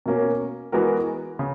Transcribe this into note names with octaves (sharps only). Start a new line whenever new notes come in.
B2 A#3 C#4
E3 G#3 B3 F#4 A#4
C#3